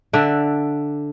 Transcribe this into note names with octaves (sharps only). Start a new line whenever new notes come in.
D3 D4 E5